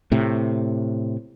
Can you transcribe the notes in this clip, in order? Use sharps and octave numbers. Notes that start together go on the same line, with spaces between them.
A2 C3